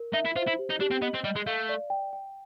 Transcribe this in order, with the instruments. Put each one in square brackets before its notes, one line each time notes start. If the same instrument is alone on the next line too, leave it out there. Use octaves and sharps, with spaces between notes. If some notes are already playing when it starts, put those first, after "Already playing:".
Already playing: [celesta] A#4
[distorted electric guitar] D#4 [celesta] E5
[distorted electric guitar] E4
[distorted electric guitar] F4 [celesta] C5
[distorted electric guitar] E4
[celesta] G4
[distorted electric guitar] D#4
[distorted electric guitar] D4 [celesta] G4
[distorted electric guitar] C4
[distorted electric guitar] B3 [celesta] D#5
[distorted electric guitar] C4
[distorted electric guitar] G3 [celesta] D#5
[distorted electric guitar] G#3
[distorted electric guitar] A3 [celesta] F5
[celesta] D5
G5
G5